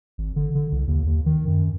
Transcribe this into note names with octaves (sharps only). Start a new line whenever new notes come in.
G#1
D3
D3
C2
D#2
D#2
D#3
F#2